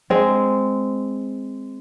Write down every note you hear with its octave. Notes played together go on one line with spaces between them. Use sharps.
G#3 C4